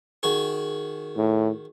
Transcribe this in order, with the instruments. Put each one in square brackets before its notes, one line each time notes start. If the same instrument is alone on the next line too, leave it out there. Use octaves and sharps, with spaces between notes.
[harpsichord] D#3 F#4 G#4
[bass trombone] A2